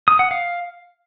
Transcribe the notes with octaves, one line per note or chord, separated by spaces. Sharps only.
D#6
F#5
F5